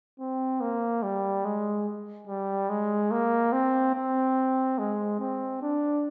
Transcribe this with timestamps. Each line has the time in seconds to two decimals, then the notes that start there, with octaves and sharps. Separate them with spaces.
0.20 C4
0.61 A#3
1.03 G3
1.45 G#3
2.27 G3
2.70 G#3
3.11 A#3
3.52 C4
3.95 C4
4.79 G#3
5.20 C4
5.62 D4